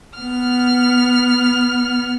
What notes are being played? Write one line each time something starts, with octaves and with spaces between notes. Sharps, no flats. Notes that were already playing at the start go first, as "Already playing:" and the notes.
B3 F6